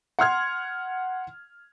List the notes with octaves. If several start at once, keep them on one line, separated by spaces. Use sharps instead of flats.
F#5 C6 F6 G#6